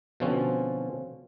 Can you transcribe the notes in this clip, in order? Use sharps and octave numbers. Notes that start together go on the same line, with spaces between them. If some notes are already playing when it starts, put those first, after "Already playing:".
B2 D3 F3 C4 C#4